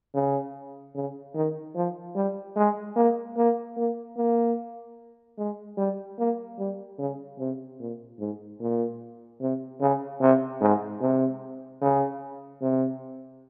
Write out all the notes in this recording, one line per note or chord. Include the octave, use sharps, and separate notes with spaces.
C#3
C#3
D#3
F3
G3
G#3
A#3
A#3
A#3
A#3
G#3
G3
A#3
G3
C#3
C3
A#2
G#2
A#2
C3
C#3
C3
G#2
C3
C#3
C3